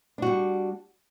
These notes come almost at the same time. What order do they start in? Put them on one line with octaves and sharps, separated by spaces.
D4 F#4 G3